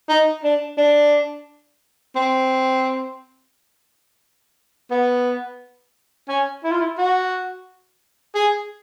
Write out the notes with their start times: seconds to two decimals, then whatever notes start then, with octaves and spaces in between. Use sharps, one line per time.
0.09 D#4
0.44 D4
0.77 D4
2.16 C4
4.91 B3
6.28 C#4
6.64 E4
6.71 F4
6.80 E4
6.98 F#4
8.35 G#4